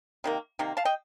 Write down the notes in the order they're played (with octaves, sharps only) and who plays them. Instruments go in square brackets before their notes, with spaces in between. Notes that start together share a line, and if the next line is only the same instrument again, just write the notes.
[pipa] C3 D#3 A#3
C3 D#3 A#3
F5 A5
D#5 G5